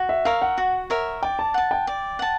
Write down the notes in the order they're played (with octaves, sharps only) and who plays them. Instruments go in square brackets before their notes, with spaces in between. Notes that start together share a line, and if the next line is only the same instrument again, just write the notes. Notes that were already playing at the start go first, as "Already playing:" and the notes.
Already playing: [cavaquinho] F#4
[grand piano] E5
[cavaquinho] A#4 C#5 E5 [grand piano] F5
[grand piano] F#5
[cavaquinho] F#4
A#4 C#5 E5
[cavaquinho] D5 [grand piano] G5
[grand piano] A5
[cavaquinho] F#5 A5
[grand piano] G5
[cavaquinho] D5
F#5 A5